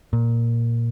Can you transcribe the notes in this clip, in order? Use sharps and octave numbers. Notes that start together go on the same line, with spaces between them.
A#2